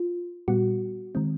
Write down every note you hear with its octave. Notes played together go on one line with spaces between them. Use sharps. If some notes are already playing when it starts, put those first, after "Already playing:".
Already playing: F4
A#2 G3 B3 F#4
D#3 G#3 C4